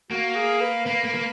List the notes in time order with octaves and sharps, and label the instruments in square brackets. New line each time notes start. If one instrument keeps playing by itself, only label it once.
[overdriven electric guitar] A#3 [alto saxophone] F#4
[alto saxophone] G#4
B4
[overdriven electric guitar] A#3 [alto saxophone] B4
[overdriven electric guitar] A#3
A#3